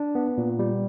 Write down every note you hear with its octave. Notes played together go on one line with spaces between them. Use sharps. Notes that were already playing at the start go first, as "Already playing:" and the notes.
Already playing: D4
B3
A#2
G3